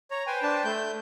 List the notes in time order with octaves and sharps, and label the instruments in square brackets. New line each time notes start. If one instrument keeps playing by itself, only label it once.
[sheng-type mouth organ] C#5 [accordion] A#5
[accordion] B4 C5 G5 [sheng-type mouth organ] G#5
[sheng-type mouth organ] D4 A5
A3 G6